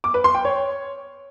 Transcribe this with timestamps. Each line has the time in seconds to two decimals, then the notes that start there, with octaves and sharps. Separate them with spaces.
0.04 D6
0.14 B4
0.24 C6
0.35 G5
0.45 C#5